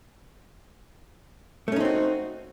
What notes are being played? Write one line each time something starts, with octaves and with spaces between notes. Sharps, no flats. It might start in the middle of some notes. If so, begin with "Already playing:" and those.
A3 C4 C#4 D#4 F#4